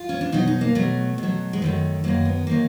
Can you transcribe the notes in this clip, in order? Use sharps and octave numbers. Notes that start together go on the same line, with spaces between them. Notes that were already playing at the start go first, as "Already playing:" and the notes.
Already playing: F4
C#4
D4
B2 F#3 D#4
D#4
A#3
B2 F#3 A3
B2 F#3
G#3
F#2 D#3 F#3 A3
F#2 D#3 F#3 A#3
B3
D#3 F#3 A#3